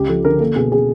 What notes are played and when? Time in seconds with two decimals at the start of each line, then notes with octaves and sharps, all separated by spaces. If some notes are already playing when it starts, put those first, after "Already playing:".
Already playing: C#2 C#4 G4
0.09 F3 A4
0.25 D3 A#4
0.40 A#3 A4
0.56 B2 G#4
0.72 G#4